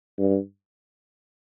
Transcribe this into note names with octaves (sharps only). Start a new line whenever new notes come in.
G2